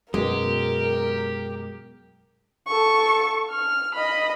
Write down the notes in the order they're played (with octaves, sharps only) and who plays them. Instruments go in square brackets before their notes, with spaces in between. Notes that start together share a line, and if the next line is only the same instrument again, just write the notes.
[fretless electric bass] F#2 B2 [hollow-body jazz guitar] G#3 [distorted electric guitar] G4 [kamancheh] A#4
[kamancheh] A4 C#6
F6
D#5 B5